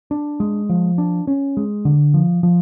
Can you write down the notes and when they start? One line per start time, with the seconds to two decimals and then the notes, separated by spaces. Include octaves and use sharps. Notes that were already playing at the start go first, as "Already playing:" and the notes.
0.11 D4
0.40 G#3
0.69 F3
0.98 D4
1.27 C#4
1.57 G#3
1.85 D3
2.14 F3
2.43 F3